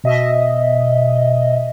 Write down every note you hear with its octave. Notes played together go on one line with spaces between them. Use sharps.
B2 D#5 E5